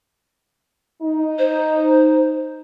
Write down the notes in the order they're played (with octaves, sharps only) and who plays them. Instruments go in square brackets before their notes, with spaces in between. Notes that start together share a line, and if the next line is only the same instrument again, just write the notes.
[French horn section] D#4
[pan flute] C5